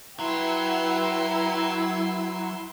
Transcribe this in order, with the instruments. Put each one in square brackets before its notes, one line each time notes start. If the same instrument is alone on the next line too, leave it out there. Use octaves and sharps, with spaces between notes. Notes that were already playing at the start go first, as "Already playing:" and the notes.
[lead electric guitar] F#3 [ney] E4 [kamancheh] B4 G5 [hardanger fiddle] E5 C6